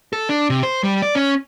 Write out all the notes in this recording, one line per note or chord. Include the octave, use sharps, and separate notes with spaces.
A4
D4
C3
C5
G3
D5
C#4